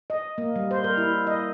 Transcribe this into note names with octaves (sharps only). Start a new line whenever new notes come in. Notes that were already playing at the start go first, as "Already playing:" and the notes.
D#5
A#3
G3
C5
A#4
E4
D#5